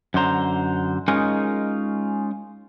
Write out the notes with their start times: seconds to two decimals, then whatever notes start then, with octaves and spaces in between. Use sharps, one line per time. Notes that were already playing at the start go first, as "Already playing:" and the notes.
0.14 F#2 D3 C5 A#5
1.08 G#3 C#4 D#4 F4 G#4 A#4